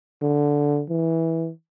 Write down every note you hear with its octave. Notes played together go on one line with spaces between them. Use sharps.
D3
E3